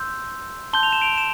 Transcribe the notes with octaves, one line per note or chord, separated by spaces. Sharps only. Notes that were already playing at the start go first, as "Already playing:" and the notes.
Already playing: C6 E6 G6
A5 C6 G6 G7
F7
E7
D7 F7
E7